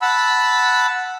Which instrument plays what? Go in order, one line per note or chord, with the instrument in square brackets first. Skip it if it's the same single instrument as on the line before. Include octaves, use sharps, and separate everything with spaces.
[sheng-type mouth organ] F#5 A5 B5 E6